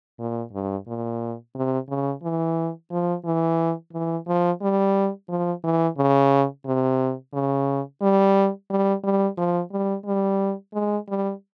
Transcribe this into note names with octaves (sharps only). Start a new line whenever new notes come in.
A#2
G2
A#2
C3
C#3
E3
F3
E3
E3
F3
G3
F3
E3
C#3
C3
C#3
G3
G3
G3
F3
G3
G3
G#3
G3